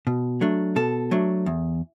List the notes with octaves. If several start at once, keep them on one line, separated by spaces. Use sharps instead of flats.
B2
F#3 A3 D4
B2 A4
F#3 A3 D4
E2